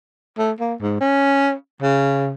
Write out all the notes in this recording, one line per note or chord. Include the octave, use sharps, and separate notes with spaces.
A3
A#3
G#2
C#4
C#3